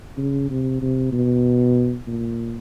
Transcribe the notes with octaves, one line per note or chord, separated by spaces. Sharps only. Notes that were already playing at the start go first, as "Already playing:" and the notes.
C#3
C3
C3
B2
A#2